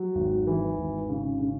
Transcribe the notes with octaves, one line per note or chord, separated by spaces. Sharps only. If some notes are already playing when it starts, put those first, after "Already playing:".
Already playing: F#3
G#1
E3
G#1
C#3
C#3